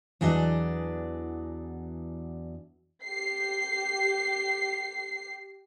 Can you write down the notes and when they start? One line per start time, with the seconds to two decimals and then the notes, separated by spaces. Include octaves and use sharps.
0.21 E2 E3 F#3 D4 D5 D#5
3.05 G4 C7